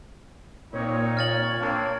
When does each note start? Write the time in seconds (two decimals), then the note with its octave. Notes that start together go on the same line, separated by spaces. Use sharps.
0.73 A#2 C4 D#4 C#5
1.17 F6 A6 F#7
1.60 A#3 C4 D4